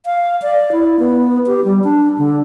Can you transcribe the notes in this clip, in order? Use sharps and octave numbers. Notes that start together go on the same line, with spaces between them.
F5
D5
E4
B3
G4
G3
D4
D3